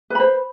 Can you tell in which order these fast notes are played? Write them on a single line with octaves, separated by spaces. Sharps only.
B4 B5 C5